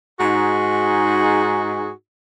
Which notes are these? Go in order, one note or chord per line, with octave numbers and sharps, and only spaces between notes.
G#2 D#4 F#4 G#4